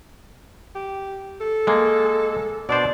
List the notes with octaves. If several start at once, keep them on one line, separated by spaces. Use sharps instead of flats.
G4
A4
G#3 A#3
B2 D4 C5 D5